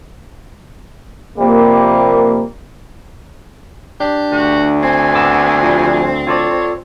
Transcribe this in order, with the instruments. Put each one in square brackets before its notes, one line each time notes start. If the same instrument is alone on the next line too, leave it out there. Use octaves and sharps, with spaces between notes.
[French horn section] C3 F3 G3 A#3
[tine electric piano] D4 [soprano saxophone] G4
[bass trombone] D2 [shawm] F#4
[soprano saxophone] C4 [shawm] G#5
[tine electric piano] B3 D6 E6
F3 G3
[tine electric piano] F4 A4 D5 [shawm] C#5